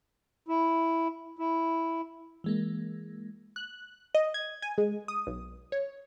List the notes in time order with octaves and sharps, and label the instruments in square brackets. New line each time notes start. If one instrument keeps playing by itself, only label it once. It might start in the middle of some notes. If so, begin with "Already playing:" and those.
[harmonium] E4
E4
[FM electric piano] E3 G#3 A#3
[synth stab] F#6
D#5
G#6
G#5
G#3
D#6
B1
C#5